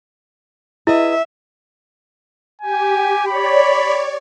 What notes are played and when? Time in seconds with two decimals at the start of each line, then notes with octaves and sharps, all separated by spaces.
0.87 E4 G#4 B4 D#5 E5
2.61 G4 G#5
3.27 C#5 D5 B5